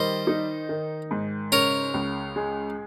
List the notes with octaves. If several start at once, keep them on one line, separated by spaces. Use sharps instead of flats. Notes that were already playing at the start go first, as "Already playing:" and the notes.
Already playing: D#3 G3 C5 D#5
D#4
D#3
G#2
C#3 A#4 C#5
C#2
G#3